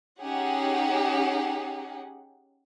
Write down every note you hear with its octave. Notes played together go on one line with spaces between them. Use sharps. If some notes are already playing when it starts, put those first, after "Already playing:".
C#4 D#4 G4 G#4 F#5